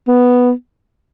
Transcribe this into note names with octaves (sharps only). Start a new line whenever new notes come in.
B3